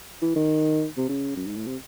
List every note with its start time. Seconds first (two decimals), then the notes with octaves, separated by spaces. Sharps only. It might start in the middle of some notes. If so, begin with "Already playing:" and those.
0.22 E3
0.36 D#3
0.97 C3
1.09 C#3
1.36 F#2
1.46 G#2
1.56 A2
1.66 C3